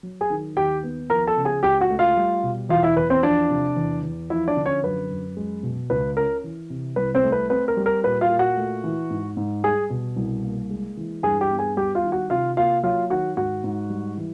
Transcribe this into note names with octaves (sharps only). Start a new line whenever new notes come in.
F#3
G#4 G#5
D#3
D#2 G4 G5
B3
F3 A#4 A#5
A4 A5
C#3
G#4 G#5
C#2 G4 G5
F#4 F#5
A3
F4 F5
G3
B2
E2 F4 F5
E4 E5
E2 B4
C4 C5
F3 D4 D5
C3
E2
E2
F3 E4 E5
D4 D5
D3
C#4 C#5
F#2 B4
F#2
G#3
B2
C#2 B4
C#4 A#4
E3
C3
C2 B4
C4 C5
A3
B4
C4 B4
A#4
G3
A#4
A#2 B4
F4 F5
A#2
F#4 F#5
A3
E3
G#2
G#2
G3 G#4 G#5
B2
C2
A#3
G#3
E3
G2 G#4 G#5
G4 G5
B3
G#4 G#5
G3 G4 G5
F4 F5
D#3
F#4 F#5
C3 F4 F5
A#3 F4 F5
F#3 F4 F5
D#3 F#4 F#5
G#2 F#4 F#5
G#2
G3
E3